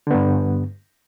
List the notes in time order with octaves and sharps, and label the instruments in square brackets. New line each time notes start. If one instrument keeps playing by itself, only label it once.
[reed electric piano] D3
B3
G2